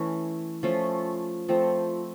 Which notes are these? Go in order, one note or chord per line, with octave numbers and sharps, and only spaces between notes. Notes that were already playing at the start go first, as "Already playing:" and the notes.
Already playing: E3 A3 C#4
F3 A3 C#4 F4
F3 A3 C4